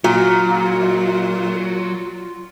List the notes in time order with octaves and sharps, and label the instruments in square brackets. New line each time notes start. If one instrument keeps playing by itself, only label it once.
[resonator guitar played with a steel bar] A#2 [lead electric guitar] F#3 [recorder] F4 [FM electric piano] F#4